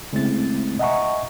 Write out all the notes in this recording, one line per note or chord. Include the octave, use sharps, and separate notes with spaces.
C#3 G#3 A3 C4 E4 A6
D#5 E5 F#5 G#5 A#5 C#6